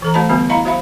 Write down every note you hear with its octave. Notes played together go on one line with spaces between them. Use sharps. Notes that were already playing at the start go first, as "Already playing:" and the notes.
E3 A4 A#5
A3 F#4 C5 D#5 A5 B5
D3 G3 B3 F#4 A5
E4 D#5 F5 F#5 A#5 B5
F#4 C5 E5 F5 B5